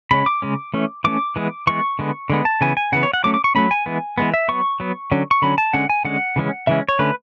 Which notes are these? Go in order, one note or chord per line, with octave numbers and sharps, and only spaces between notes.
C#3 G#3 C#4 B5
D6
C#3 G#3 C#4
E3 A3 C#4
E3 A3 C#4 D6
E3 G#3 B3
E3 G#3 B3 C#6
D3 G#3 B3
D3 G#3 B3
A5
C#3 E3 B3 G#5
G#5
C#3 E3 B3 F#5
C#5
F#5
F#3 A3 C#4 D6
D6
C#6
F#3 A3 C#4 B5
G#5
E3 G#3 B3
E3 G#3 B3
E5
F#3 B3 C#6
F#3 B3
D3 F#3 C#4
C#6
D3 F#3 C#4 B5
A5
D3 G#3 C#4 F#5
G#5
D3 G#3 C#4 F#5
C#3 E3 G#3 C#4
C#3 E3 G#3 C#4 E5
C#5
D3 A3 C#4 B4